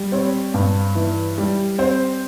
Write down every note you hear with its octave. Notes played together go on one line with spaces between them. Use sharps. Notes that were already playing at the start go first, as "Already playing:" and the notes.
Already playing: G3
C4 C#5
G2
E3
G3
C4 C5